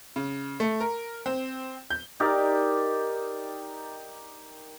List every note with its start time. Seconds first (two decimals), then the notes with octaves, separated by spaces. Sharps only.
0.16 C#3
0.60 A3
0.80 A#4
1.26 C4
1.90 G6
2.20 D#4 G4 A#4 D5